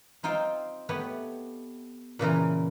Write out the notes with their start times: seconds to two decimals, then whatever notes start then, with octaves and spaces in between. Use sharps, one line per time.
0.23 C4 D#4 F4 C5 G5
0.89 A3 B3 G4 C#5 F#5
2.19 A#2 C#3 E3 A#4